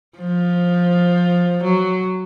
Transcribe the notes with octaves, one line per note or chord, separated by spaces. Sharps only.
F3
F#3